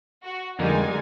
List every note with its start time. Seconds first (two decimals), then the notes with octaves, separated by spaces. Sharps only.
0.23 F#4
0.59 F2 D3 G3 G#3 A#3 D#4 G#5